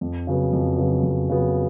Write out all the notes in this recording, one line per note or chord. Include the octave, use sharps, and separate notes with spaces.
F2
C#3 F#3 B3
F2
C#3 F#3 B3
F2
C#3 F#3 B3